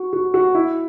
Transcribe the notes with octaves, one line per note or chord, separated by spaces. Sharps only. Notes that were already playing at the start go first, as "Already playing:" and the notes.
Already playing: F#4
F#4
F#4
E4